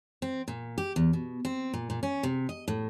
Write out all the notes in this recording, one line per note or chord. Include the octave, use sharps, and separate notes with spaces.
C4
A#2
G4
E2
B2
C4
A#2
A#2
C#4
C3
D#5
A2